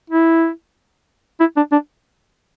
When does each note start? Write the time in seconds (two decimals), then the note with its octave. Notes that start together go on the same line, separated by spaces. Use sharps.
0.10 E4
1.40 E4
1.57 D4
1.72 D4